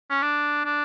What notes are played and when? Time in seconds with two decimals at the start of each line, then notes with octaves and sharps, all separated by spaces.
0.10 C#4
0.23 D4
0.65 D4